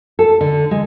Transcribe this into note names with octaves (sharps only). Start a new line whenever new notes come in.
A4
D3
G#3